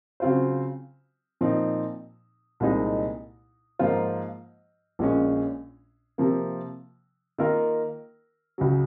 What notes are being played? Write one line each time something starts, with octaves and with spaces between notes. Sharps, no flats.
C#3 F#3 C4 F4 C5
A#2 F3 C4 D#4
C2 A#2 G#3 C4 D#4
G#2 F3 A#3 F4 C5
A#1 A#2 G#3 C#4
C3 F3 A#3
D#3 A#3 F4 A#4
C#2 C#3 F#3